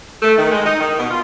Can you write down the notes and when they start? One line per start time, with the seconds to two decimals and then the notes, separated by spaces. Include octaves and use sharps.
0.22 A3
0.37 D#3
0.51 G#3
0.65 D#4
0.79 D#3
0.97 B2
1.10 F4